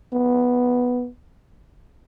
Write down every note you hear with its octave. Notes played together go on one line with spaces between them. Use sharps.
B3